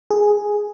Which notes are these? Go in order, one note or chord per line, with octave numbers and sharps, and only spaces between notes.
G#4